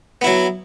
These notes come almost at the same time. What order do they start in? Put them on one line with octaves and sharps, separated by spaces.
B3 E4 F#3